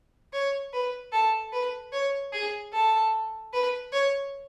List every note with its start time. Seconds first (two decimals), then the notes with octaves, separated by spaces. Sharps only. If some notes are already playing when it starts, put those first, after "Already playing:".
0.33 C#5
0.73 B4
1.12 A4
1.52 B4
1.92 C#5
2.32 G#4
2.73 A4
3.53 B4
3.93 C#5